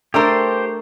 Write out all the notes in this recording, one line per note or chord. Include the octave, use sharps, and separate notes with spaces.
A3 D4 G4 A#4 C5